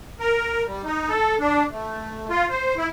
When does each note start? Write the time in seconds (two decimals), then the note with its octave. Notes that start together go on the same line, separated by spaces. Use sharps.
0.20 A#4
0.66 G3
0.84 D#4
1.09 A4
1.39 D4
1.71 A3
2.30 F4
2.50 C5
2.77 E4